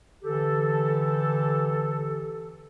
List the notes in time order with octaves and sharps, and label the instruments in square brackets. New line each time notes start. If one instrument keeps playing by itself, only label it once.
[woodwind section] D3 E3 G4 A4